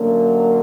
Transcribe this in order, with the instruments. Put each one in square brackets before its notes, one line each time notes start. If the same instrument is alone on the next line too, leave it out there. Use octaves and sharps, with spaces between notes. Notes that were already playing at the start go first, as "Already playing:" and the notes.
Already playing: [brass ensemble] F#2 D3 F#3 A#3